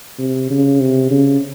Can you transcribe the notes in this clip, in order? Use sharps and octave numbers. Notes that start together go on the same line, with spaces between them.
C3
C#3
C3
C#3